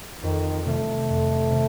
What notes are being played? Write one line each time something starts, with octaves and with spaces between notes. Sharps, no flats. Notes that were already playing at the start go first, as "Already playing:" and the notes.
F2 D#3
C3 D#3 G3 A3
F2
C3 D#3 G3